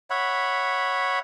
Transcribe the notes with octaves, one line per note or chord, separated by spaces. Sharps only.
C#5 E5 F#5 B5